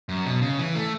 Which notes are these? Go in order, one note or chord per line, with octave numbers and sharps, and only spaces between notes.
F#2
B2
C#3
E3
A3